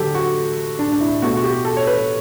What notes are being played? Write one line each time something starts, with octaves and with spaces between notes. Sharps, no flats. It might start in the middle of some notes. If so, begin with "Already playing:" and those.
Already playing: D3 F#3 A3 G4 A4
F#4
D4
D4
E4
B2 A3 F#4
F#4
G4
A4
C#5
B4